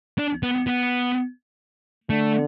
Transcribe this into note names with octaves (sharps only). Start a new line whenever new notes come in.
D4
B3
B3
D3 A3